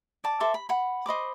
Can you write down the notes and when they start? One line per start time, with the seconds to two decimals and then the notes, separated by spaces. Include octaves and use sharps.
0.24 D5 A5 D6
0.40 A4 C5 E5 D6
0.54 B5
0.69 F#5 B5
1.06 C5 D#5 B5 D6